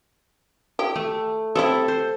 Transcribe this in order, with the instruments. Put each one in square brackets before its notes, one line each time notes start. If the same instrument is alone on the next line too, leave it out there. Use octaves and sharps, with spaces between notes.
[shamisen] G4
[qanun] A3
[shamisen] G3 C4 E4 [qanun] A4
[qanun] C5